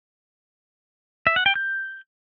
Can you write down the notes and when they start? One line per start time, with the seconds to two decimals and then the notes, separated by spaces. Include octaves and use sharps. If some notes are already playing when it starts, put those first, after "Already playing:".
1.27 E5
1.36 F#5
1.46 G5
1.55 G6